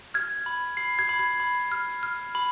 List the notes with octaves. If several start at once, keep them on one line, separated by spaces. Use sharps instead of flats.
F6 G#6
B5
B5 C7
G#6
B5
G#6
B5
F6
F6
B5